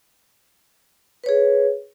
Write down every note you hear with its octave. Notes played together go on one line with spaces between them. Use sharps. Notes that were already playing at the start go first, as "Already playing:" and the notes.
G#4 B4 C#5